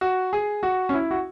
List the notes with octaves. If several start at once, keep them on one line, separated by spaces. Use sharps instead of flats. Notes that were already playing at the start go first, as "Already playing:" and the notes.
F#4
G#4
F#4
C#4
E4
F#4